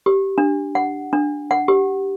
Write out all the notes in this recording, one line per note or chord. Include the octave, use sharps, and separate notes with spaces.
G4
D4
F#5
D4
F#5
G4